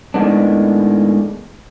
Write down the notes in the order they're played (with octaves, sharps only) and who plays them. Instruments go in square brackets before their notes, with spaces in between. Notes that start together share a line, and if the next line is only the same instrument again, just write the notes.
[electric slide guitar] A2 D#3 G#3 B3 D4